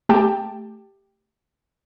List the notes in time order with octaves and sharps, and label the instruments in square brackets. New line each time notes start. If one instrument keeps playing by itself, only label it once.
[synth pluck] A3 G4 G5 A5